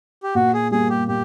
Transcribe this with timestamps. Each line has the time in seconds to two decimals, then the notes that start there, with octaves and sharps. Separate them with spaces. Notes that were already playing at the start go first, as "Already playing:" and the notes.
0.23 G4
0.35 A#2 F#4
0.54 G#4
0.71 G3 A#3 G#4
0.90 G4
1.08 A#2 G4